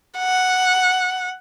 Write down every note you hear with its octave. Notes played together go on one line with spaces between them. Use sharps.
F#5